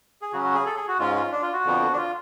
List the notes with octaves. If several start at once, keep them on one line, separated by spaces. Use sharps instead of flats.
G#4
C#3 F#3 C#4 F#4
F#4
G#4
A4
G#4
F#4
G#2 G#3 C#4 F4
F4
D4
F4
F#4
F2 D3 F3 B3
D4
F4